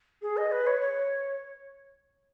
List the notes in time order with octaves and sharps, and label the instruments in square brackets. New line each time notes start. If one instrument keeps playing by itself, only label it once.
[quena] G#4
D#5
B4
C#5
C#5